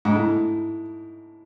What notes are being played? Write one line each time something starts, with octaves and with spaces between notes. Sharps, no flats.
G#2
A2